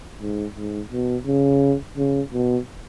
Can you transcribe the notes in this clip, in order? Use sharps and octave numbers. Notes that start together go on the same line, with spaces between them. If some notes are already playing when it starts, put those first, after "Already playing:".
G#2
G#2
B2
C#3
C#3
B2